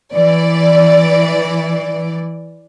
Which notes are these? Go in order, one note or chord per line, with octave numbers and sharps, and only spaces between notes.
E3 D5